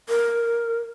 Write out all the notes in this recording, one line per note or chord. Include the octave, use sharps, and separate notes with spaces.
A#4